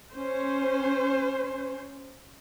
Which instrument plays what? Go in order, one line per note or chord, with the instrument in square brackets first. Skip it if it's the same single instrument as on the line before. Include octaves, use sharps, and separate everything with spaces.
[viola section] C#4 C5